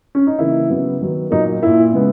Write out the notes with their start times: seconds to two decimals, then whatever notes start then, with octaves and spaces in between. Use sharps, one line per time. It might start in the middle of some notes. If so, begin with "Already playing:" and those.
0.15 C#4
0.27 D#4
0.39 C#3 E3 A#3 E4
0.70 C#3 F#3 B3
1.00 D#3 F#3 B3
1.31 A#2 F#3 A#3 D#4
1.62 A#2 A#3 E4
1.92 C#3 G#3 B3